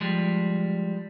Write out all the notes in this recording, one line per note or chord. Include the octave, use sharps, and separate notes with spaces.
F3 G3 G#3